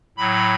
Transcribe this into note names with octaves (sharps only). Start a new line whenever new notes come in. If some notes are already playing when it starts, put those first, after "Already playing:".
A2 F#3 B5